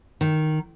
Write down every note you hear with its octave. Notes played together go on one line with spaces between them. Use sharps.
D#3